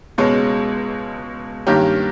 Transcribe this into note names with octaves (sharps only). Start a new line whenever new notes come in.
C#2 B2 G#3 C#4
G2 D#3 A#3 C#4 G4